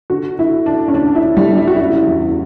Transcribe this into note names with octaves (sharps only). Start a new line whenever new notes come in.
D3 F#4
D3 E4
D3 D4
C#4
D2 D4
E4
D2
G3
D3
E4
F#4
F#1 E4
E2